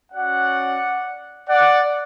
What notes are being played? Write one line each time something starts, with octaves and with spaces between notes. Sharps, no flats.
C#4 F#4 D5 F#5
D5 F#5